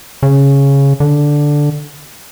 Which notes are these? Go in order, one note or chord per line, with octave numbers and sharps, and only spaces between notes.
C#3
D3